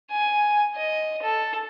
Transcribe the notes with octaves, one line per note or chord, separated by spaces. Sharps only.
G#5
D#5
A4